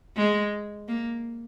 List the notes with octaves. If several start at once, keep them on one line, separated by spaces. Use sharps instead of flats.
G#3
A#3